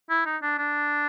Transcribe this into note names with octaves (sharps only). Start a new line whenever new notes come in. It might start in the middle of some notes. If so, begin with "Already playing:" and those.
E4
D#4
D4
D4